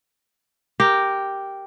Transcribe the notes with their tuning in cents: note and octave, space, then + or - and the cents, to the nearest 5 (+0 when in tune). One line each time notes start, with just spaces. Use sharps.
G4 +0 A#4 +0